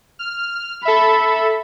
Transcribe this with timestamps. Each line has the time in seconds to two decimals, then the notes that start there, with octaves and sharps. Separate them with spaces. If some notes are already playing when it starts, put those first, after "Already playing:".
0.19 F6
0.85 A4 E5 B5